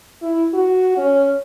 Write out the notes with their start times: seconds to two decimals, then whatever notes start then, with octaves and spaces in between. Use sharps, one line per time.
0.22 E4
0.54 F#4
0.97 C#4